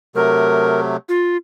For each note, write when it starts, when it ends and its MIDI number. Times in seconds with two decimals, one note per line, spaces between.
0.15 0.97 48
0.15 0.97 54
0.15 0.97 57
0.15 0.80 70
1.09 1.37 65